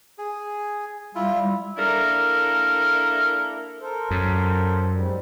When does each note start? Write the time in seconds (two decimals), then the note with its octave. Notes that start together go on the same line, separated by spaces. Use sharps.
0.18 G#4
1.15 G3 E4 F4
1.77 A#3 D4 E4 A4 A#4
3.81 A4 A#4 C5
4.11 F#2
4.91 G#2 G3